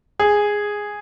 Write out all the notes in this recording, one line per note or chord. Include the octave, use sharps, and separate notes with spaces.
G#4